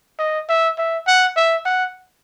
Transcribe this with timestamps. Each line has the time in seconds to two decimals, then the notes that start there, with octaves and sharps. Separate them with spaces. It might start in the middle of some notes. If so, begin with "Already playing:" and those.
0.19 D#5
0.49 E5
0.78 E5
1.07 F#5
1.36 E5
1.66 F#5